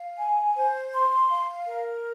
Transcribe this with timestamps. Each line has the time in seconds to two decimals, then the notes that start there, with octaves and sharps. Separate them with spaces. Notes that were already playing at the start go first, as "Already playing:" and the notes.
Already playing: F5
0.18 G#5
0.56 C5
0.93 C6
1.30 F5
1.67 A#4